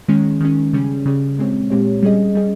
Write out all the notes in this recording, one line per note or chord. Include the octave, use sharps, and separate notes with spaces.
D#3 G#3 C#4
D#3 G#3 C#4
C#3 G3 C#4 G#4
C#3 G3 C#4 G#4
A#2 G#3 C4 G4 C#5
A#2 G#3 C4 G4 C#5
G3 C#4 G#4 D#5
G3 C#4 G#4 D#5